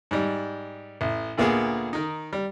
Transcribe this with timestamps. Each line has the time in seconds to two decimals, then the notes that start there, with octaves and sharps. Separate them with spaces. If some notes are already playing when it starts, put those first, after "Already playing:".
0.11 G#2 G3
1.01 A1
1.38 D2 A#2 A#3 B3 G#4
1.93 D#3 D#4
2.33 G3